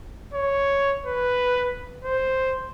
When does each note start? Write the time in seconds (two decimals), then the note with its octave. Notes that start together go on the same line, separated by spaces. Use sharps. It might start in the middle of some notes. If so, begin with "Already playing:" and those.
0.33 C#5
1.06 B4
2.04 C5